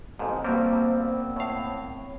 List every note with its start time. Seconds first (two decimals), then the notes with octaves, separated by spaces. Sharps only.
0.19 A1 F2 G#2 B3 C4 D#5
0.44 G2 F#3 G3 A#3 C5
1.37 A2 C#5 F5